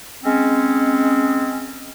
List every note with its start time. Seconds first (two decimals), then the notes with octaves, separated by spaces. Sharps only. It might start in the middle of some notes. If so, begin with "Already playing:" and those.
0.24 G#3 C4 C#4